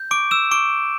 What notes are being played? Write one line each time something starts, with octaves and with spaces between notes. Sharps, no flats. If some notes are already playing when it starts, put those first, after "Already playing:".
Already playing: G6
C#6 D6 D7
E6 E7
C#6 D6 D7